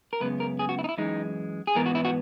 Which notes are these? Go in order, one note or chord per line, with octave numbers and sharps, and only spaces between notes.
A#4
F#2 C#3 G#3 B3 B4
A#4
G#4
F#4
E4
D#4
E4
F#2 E3 G#3 D#4
G#4
G#2 E3 B3 A#4
F#4
E4
F#4